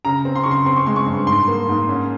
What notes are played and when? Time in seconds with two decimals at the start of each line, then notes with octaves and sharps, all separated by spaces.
0.05 C#3 A#5
0.25 C4
0.36 C6
0.44 C#3 C#6
0.51 C6
0.66 C4 C6
0.77 C#6
0.86 G#3 C6
0.96 C#6
1.06 G2
1.27 G#2 C6
1.48 A#3
1.69 G#2
1.89 C#4